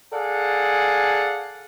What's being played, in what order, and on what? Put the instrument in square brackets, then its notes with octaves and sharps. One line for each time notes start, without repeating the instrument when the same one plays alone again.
[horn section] G#4 A4 D5 F5 F#5